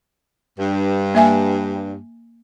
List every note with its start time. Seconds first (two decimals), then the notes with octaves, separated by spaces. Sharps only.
0.59 G2
1.15 A#3 E5 G#5